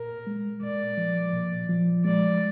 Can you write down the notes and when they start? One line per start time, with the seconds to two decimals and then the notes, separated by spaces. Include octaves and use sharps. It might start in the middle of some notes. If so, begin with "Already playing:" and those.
Already playing: A#2 A#4
0.27 G#3
0.62 A#2 D5
0.97 F3
1.33 A#2
1.69 F3
2.04 G#3 D5